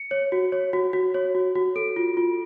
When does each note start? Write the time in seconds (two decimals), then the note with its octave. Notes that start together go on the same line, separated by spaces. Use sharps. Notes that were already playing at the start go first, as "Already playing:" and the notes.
Already playing: C#7
0.11 C#5
0.32 F#4
0.52 C#5
0.73 F#4
0.93 F#4
1.14 C#5
1.35 F#4
1.55 F#4
1.76 A4 D7
1.96 F4
2.17 F4